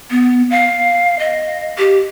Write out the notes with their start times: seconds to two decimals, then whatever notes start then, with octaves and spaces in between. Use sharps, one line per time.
0.11 B3
0.50 F5
1.19 D#5
1.78 G4